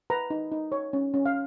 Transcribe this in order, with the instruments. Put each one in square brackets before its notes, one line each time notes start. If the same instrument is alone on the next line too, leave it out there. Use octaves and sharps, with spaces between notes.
[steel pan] B4 A#5
D#4
D#4
C#5
C#4
C#4
F5